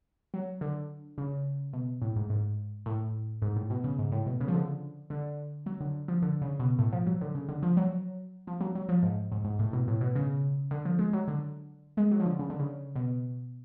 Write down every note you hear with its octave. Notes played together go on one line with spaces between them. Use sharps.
F#3
D3
C#3
B2
A2
G#2
G#2
A2
G#2
A2
B2
C#3
G#2
A2
B2
C#3
F3
D3
D3
F#3
D3
F3
D3
C#3
B2
A2
F3
F#3
D3
C#3
D3
F3
F#3
F3
F#3
F#3
F3
G#2
G#2
G#2
A2
B2
A2
B2
C#3
D3
F3
G#3
F#3
D3
G#3
F#3
F3
D3
C#3
D3
C#3
B2